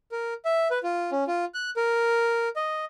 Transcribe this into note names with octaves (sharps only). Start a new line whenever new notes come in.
A#4
E5
B4
F4
C#4
F4
F#6
A#4
D#5